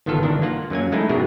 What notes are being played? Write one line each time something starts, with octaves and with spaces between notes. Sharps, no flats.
G1 D#3 B3 F4 A4 F5
G1 D#3 E3 D4 A#4
A#3 F4 F#5
F#2 F#3 A#3 G#5
G#3 A3 D#4 E4 G#4
G2 B2 B3 F#4 G#4 A#4